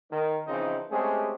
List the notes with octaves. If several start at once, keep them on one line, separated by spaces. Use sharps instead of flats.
D#3
C#3 E3 F3 C4 D#4
G#3 A3 C4 C#4 G4 G#4